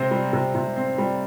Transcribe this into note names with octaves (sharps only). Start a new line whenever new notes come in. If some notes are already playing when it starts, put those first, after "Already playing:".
Already playing: C3 C4 C5
G3
C3
C3
C4
G3